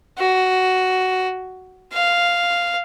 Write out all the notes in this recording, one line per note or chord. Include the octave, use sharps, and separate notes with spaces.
F#4
F5